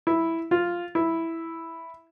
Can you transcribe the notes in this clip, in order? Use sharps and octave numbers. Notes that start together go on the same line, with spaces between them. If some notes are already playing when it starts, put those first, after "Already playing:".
E4
F4
E4